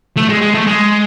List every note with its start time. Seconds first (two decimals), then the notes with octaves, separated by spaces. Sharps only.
0.17 A3
0.29 G#3
0.41 G#3
0.54 A3
0.66 G#3